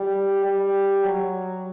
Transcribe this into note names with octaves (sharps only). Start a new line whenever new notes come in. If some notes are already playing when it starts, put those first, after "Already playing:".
Already playing: G3
G3
F#3